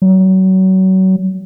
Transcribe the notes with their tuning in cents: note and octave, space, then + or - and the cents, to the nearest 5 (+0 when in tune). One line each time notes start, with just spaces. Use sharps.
F#3 +30